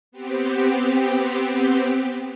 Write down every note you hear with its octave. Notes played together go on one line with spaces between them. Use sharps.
B3 C4 G4